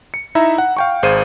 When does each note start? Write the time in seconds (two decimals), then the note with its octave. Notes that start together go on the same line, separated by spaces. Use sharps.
0.14 C#7
0.35 D#4 E4 E5 A#5
0.58 F#5
0.77 F5 G5 C#6
1.03 G#1 G#4 C5 F5 D#7